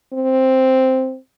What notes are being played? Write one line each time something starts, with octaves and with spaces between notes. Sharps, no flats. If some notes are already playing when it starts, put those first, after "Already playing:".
C4